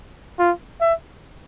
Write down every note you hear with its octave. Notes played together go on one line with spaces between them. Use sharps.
F4
E5